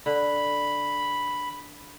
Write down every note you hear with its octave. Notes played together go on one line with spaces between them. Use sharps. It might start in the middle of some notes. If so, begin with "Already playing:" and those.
D3 B5